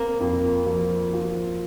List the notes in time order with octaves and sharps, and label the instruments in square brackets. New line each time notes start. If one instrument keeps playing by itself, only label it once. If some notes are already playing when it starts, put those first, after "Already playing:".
Already playing: [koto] A#3 [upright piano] C4
[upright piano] F2
F3
F3